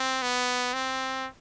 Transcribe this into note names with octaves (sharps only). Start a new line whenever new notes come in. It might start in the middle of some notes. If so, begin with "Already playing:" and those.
Already playing: C4
B3
C4